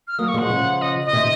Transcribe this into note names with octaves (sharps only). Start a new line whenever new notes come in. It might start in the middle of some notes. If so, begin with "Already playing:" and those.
F6
F#3 A#3 D#6
C#6
F3 G#3 F#5
C#3 F3
D#5
D#5
C3 D#3